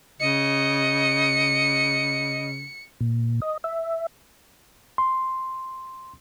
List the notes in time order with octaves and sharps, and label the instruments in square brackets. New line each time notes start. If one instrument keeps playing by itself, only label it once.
[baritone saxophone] C#3 [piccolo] D#5 [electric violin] C#7
[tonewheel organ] A#2
D#5
E5
[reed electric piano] C6